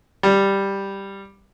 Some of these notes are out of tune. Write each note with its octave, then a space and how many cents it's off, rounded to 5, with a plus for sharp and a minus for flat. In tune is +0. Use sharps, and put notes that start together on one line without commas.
G3 +5